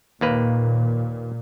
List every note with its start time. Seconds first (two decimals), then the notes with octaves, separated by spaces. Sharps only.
0.21 D#2 A#2 A#3 B4